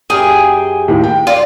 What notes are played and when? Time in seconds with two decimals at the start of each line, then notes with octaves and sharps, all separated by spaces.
0.10 F#2 G4 G#4 G5
0.88 D#2 A2 D#3
1.04 G5
1.27 F4 D5